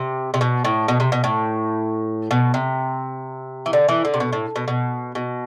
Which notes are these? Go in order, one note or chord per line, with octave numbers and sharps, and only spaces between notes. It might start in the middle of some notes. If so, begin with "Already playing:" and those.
Already playing: C3
C3
B2
A2
B2
C3
B2
A2
B2
C3
E3
D3
E3
D3
C3
B2
A2
B2
B2
B2